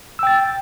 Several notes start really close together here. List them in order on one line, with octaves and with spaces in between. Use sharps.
E6 G5 A6